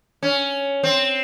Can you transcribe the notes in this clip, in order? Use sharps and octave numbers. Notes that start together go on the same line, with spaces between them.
C#4
C4